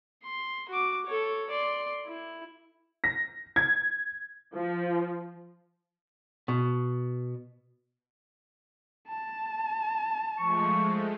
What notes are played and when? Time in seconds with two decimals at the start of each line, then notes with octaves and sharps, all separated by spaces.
0.24 C6
0.69 F#4 D6
1.06 A4 C#5
1.50 D5 C6
2.06 E4
3.04 A#6
3.56 G#6
4.55 F3
6.48 B2
9.08 A5
10.38 F3 G#3 A3 C#6